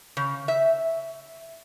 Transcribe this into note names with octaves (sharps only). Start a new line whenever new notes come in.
C#3
E5